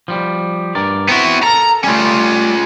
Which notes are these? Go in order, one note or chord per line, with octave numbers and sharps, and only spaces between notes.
F3 G3
G2 A#4 D5
B3 C4 E4 F#4
A4 A#4 A#5
G3 A3 C#4 F4